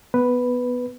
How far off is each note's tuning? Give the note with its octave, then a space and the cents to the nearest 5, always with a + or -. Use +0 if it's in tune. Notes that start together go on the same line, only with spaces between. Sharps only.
B3 +0 B4 +0